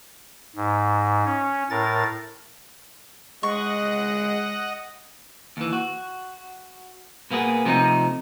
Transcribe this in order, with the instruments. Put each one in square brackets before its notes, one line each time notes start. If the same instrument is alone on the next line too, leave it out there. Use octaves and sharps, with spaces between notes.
[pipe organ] G#2
C#4
A2 A#4 A6
[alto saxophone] G#3 [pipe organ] D#5 F#5 [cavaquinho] C#6
[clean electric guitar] D#2 E3
F#4
B2 A#3 B3 G#4
C3 F3 A3 D4 D#4